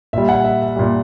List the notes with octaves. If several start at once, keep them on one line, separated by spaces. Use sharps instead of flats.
A#2 G3 E5
F#5
E5
E5
A#2 G3